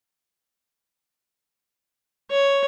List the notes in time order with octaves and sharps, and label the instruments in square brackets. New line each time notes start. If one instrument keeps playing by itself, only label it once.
[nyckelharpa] C#5